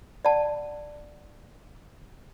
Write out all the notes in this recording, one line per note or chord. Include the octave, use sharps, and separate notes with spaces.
D5 F#5 A5